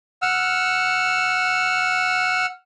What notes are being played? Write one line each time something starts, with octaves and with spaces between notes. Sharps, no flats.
F#5 E6 F6